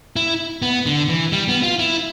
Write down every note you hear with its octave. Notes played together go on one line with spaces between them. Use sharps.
E4
B3
D3
E3
G3
B3
F4
E4